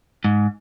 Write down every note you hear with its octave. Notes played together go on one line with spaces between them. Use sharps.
G#2